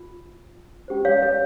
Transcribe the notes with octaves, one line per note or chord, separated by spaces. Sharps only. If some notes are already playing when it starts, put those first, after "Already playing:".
Already playing: F4
C#4 G4 C5
C#5 F5
C#5